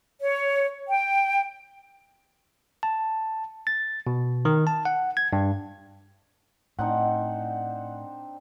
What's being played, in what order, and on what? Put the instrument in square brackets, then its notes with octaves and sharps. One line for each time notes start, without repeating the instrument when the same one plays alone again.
[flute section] C#5
G5
[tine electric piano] A5
A6
B2
D#3
A5
F#5
G#6
G2
[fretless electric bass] A2 [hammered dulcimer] C4 D4 D#4 [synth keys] F#5